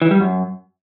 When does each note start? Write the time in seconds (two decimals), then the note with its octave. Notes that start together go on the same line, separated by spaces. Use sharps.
0.02 E3
0.11 G3
0.20 F#2